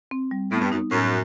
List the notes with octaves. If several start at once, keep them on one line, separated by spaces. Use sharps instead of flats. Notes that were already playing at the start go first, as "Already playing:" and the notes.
C4
G3
A2 B3
G2
F#2 D#4
F#2 A2